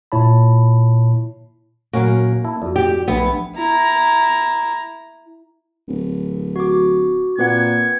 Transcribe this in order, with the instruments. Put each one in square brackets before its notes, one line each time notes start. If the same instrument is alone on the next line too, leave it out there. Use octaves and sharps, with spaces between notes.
[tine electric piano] A#2 E4 C#5 A5 B5
[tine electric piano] A#2 [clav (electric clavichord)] F#3 C#4 F#4 [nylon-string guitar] A#3
[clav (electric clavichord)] E4 [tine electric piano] A5
[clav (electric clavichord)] F2 [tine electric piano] F#4 D5
[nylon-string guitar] G4
[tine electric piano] B1 F3 D4 [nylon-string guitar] B3 [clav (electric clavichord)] E5 G#5
[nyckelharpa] E4 A#5
[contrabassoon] D1
[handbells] F#4 D6
[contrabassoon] A#2 [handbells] C4 B4 F#5 [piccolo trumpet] G#6